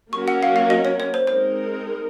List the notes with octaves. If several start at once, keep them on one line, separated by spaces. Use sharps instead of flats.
F#3 A#3 C#4 F#4 A#4 C#6
F#5
F5
F5
D#5
C#5
C#5
C5
G#3 C4 D#4 A#4 C5